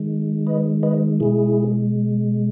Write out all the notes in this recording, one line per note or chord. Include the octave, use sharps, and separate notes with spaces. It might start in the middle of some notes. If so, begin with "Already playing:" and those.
Already playing: D#3 G#3
B4 D#5
B4 D#5
B2 G#3 E4 G#4